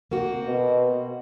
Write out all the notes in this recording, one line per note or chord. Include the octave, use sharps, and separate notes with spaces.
A#3 C4 F#4
B2